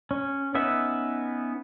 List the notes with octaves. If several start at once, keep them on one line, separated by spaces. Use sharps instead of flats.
C#4
B3 C#4 D#4 B4 E5